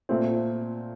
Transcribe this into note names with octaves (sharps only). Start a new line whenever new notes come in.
A#2 A3 C4